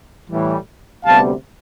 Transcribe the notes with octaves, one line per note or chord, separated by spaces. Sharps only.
A2 E3 G3
D2 C3 G3 B3 F5 A5